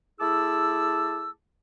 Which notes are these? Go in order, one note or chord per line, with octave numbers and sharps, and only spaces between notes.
A3 E4 G#4 A5 D6 E6